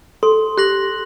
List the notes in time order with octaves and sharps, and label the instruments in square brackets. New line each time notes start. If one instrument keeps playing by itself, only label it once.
[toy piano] A4 [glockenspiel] C6
[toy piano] G4 [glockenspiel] F#6 A#6 F#7